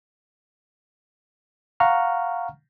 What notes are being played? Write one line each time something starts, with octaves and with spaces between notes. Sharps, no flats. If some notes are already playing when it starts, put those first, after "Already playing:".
F5 F#5 A#5 C#6 F6